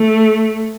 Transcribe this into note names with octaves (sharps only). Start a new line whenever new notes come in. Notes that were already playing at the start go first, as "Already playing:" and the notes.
Already playing: A3